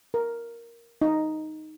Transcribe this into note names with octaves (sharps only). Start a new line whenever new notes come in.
A#4
D#4